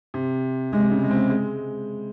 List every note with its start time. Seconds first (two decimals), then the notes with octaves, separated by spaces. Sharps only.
0.14 C3
0.73 C3 G#3
0.91 C#3
1.01 G#3
1.11 C4
1.30 G#3